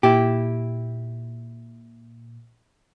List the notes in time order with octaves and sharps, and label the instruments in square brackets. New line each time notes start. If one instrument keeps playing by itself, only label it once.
[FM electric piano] A#2 [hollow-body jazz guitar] E4 G4